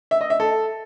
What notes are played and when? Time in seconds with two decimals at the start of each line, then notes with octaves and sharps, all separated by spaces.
0.11 E5
0.21 D#5
0.30 E5
0.40 A4